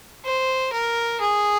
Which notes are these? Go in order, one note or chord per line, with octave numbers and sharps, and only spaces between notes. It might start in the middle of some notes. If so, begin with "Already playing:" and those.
C5
A#4
G#4